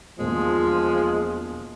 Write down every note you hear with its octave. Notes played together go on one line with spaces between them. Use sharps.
E1 D#2 F3 G#3